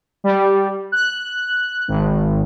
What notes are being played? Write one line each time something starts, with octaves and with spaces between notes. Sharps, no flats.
G3
F#6
G#1